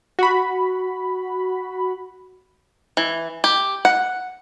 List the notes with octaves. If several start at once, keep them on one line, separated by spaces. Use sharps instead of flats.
F#4 B5
E3
G4
F#5